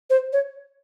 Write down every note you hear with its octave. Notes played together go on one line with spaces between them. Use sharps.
C5
C#5